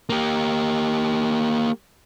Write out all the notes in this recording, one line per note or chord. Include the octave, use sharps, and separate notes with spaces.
A#3 G4